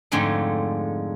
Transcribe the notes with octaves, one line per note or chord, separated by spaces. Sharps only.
F2 G#2 D3 G#3 A3